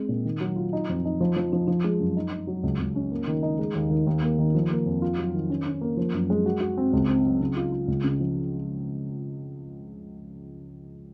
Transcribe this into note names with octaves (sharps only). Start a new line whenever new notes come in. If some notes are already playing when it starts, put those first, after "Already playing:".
Already playing: G#3 C4 D#4
A#2
D#3
F#3
F4
D#4
F2
D#4
F3
F3
F3
F3
G#3
F#2
D#4
D#4
F#3
C#2
C#2
C#4
A#3
D#3
D#4
G#3
D#2
D#3
D#2
A#3
D#3
F3
A#3
F2
F4
F#3
D#3
C#4
C#4
A#3
F3
F#2
G#3
F#4
F#4
C4
C#2
C4
F#3
C#3
F4
F4
C#2
C#3
F3